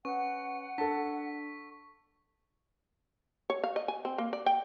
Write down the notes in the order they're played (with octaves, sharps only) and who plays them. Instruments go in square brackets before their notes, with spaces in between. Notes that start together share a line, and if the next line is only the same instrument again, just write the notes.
[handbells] C#4 B4 [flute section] F#5 [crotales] C#6
[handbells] D4 [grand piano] A4 A5 [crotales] B6
[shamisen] C#5
F5
D#5
G#5
C4
A#3
D5
G5